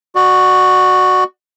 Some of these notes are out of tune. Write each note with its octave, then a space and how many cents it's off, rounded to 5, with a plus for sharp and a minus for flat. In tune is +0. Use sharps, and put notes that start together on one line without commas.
F#4 +0 D5 +30